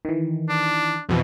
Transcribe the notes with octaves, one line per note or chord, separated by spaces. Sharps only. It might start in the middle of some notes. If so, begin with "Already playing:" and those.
D#3 E3
D4
F2 B2 E3